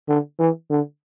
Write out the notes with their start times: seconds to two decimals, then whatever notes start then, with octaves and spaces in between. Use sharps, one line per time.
0.09 D3
0.39 E3
0.70 D3